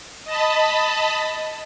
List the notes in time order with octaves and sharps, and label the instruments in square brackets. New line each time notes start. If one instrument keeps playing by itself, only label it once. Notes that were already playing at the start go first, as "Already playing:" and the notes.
[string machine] D#5 A5 B5